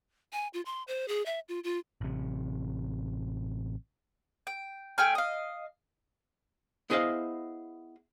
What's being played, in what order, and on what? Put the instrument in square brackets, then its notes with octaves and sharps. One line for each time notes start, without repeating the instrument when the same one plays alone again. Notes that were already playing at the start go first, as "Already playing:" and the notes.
[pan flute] G#5
F4
C6
C5
G#4
E5
F4
F4
[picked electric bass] A1 C3
[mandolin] G5
A3 G5 G#5 F6
D#5 F5
[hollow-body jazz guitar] B3 E4 G#4 C5 D#5 F5